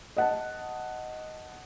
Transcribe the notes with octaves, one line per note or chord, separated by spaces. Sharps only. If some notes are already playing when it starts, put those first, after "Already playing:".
D#5 F#5 A5